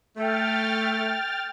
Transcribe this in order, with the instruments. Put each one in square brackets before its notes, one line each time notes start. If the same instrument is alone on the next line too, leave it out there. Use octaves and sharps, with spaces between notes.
[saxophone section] A3 [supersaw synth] G5 F6 A6